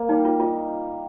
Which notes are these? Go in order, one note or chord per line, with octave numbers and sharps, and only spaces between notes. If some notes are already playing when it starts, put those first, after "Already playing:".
Already playing: A#3
G3 D#4
F4
D#4 F4